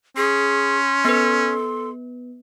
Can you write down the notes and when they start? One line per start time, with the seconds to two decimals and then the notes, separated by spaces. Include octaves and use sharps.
0.17 C#4 G#4 C6
1.05 B3 A4 B4